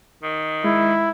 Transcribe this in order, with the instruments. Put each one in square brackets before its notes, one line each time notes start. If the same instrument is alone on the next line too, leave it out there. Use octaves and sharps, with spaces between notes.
[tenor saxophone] D#3
[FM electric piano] G#3 [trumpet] E4